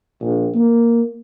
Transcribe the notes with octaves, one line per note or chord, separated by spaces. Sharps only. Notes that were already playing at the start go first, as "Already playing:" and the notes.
A#1
A#3